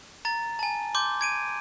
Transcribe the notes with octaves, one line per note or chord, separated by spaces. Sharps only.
A#5 A6
G#5 A5
C6 D6 G6
G#6 D7 D#7